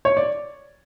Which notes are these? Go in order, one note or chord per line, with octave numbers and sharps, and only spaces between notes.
C#5
D5